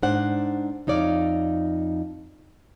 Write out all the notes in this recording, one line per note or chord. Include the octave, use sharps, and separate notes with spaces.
G#2 D4 C5 F#5
F2 D#4 C#5 D5 F5